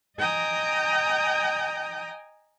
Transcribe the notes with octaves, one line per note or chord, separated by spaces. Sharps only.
D#5 G5 G#5 A#5 D#6